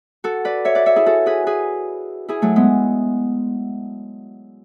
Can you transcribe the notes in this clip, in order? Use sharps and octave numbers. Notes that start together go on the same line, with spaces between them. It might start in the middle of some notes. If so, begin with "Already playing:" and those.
F#4 A4
B4 D5
C#5 E5
B4 D5
C#5 E5
E4 G#4
F#4 A4
G#4 B4
G#4 B4
E4 G#4
F#3 A3
G#3 B3